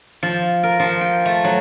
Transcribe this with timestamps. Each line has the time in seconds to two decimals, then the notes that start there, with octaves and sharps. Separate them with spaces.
0.23 F3
0.63 A#4
0.80 F3
1.01 G5
1.25 A3
1.44 F#3